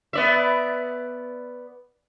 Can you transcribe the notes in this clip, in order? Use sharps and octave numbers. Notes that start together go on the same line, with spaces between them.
B3 D5 E5